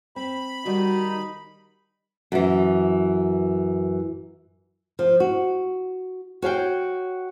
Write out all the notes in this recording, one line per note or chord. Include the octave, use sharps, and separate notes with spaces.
C4 B5
D#3 G3 D#4 F#4
F#2 E3
F3
F#4
F#4 C#5 F5 G5